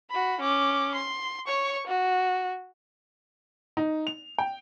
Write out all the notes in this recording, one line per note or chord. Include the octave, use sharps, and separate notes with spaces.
F#4 B5
C#4 D6
C6
C#5 C#6
F#4
D#4
F7
G5